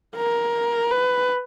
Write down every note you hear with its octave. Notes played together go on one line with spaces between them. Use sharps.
A#4
B4